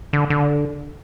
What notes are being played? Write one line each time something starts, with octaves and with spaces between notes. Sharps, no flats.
D3
D3